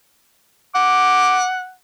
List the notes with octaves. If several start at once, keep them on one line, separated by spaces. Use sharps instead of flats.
F#5 D6